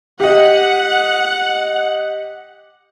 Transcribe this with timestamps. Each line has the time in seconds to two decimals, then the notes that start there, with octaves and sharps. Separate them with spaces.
0.20 G4 D#5 F#5